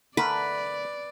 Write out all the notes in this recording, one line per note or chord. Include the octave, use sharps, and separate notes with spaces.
D3 A3 A#4 B4 D5